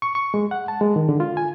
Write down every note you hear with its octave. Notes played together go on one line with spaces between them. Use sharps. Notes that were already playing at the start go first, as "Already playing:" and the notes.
C#6
C#6
G#3
F#5
A5
G#3
D#3
D3
F4
G#5